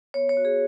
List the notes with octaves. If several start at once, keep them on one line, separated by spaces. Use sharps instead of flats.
B3 C#5
C#5
F#4
G#4